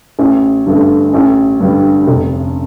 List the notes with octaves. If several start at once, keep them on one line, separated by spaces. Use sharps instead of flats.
A1
G2 D3 A3
A1
G2 D3 G3
F1